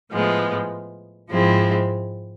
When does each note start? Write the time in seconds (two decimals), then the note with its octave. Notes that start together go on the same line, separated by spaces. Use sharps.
0.11 A2 F3 G#3 B3
1.30 G#2 F3 G#3 C4 E4